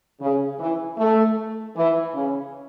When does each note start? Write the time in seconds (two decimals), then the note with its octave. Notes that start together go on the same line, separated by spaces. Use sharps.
0.21 C#3
0.59 E3
0.98 A3
1.76 E3
2.14 C#3